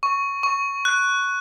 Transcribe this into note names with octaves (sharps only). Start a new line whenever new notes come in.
C#6
C#6
F#6